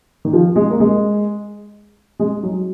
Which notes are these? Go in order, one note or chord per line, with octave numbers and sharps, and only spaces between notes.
D#3
F3
G#3
A#3
G#3
G#3
F#3